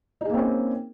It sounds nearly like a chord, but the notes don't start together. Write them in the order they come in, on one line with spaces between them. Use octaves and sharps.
D#4 G#4 A#3 C4 C#4